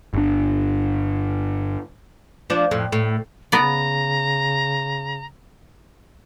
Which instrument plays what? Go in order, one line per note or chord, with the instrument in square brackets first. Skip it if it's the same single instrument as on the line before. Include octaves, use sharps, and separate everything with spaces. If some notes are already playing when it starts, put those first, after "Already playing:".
[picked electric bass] G1 D4
[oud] F3 D4
F2 A2
A2
[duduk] C#3 [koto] B3 D5 [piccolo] A#5